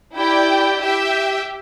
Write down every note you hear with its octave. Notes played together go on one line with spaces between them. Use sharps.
E4 G4 D5 G5
G4 E5 G5